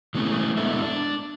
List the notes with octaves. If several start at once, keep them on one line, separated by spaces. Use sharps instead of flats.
E3 G#3 A3 B3 C#4
G#3 B3 D4 E4 A4 E5
D4